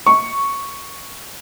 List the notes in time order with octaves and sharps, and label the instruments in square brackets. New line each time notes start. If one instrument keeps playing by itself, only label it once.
[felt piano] C#6